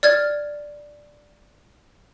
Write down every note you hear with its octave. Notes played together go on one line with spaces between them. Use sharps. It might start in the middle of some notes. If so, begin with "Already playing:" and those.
D5 F6 G#6